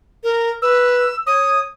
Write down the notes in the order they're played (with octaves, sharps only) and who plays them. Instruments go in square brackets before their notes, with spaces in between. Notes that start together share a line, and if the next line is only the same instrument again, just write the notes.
[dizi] A#4
[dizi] B4 [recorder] E6
[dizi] C#5 [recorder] D#6